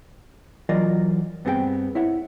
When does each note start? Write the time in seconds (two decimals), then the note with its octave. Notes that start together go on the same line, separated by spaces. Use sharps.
0.69 E3 F#3 F4 A#4 D5 D#5
1.45 G2 B3 C4 G4 G#4 G5
1.95 E4 C#5 E5 F#5